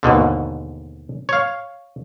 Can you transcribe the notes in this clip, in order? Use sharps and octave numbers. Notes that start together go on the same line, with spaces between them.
D#2 G#2 B2 D3
C#5 F5